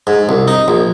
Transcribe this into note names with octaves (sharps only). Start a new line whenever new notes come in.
G#2
C2
D#4
A#1